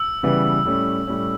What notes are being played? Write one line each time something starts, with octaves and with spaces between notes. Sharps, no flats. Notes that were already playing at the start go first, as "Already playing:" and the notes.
Already playing: E6
C#3 E3 G3 B3
A2 G3 C#4
A2 G3 C#4